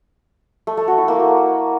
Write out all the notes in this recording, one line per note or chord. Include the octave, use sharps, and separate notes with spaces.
A3
A3
F#4
E4
A#3